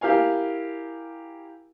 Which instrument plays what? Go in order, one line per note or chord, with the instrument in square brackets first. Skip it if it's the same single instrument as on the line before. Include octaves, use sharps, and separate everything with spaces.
[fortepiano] E4 G4 A#4 F5 G#5